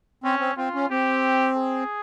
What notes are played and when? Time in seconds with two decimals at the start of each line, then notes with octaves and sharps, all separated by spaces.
0.24 C4 C#4
0.40 C4
0.57 C4 F4
0.74 C#4
0.90 C4 G4
1.57 G#4